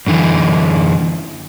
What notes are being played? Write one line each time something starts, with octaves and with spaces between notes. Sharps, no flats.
F#2 D3 E3